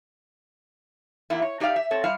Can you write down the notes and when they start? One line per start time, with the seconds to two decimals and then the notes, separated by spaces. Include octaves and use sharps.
1.30 E2 A#3 E4
1.42 C#5
1.60 D#4 G4 D5 E5 F5
1.76 E5
1.91 C4 A4 C#5
2.04 G3 F4 E5 F5